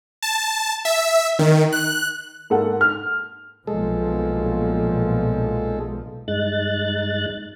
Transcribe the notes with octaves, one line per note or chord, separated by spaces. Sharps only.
A5
E5
D#3
F#6
G#2 A#3 A4 F#5
F6
B1 A#2 F3 G#3 A4
G2 G#3 D#4 F#6 A6